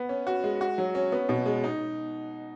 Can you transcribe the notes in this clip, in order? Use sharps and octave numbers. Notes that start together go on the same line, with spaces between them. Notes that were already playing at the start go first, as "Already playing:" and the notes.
Already playing: B3
C#4
F#4
G#3
F#4
F#3
C#4
B3
B2
G#3
D#4